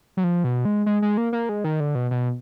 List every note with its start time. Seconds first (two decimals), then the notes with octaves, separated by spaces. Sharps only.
0.17 F#3
0.24 F3
0.44 B2
0.65 G#3
0.86 G#3
1.02 G#3
1.17 A#3
1.33 A#3
1.49 G#3
1.64 D#3
1.80 D3
1.95 B2
2.11 B2